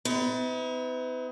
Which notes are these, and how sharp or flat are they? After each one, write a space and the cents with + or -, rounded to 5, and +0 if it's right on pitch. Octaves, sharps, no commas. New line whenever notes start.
B3 +40 E4 -40